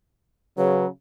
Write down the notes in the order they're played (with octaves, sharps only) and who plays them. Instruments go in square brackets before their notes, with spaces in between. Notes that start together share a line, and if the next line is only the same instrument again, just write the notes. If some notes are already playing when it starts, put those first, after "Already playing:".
[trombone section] C#3 [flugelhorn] F#3 [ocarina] B4